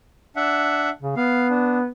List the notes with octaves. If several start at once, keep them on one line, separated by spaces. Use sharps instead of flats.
D4 E5 F#5
C#3
B3 F5
D4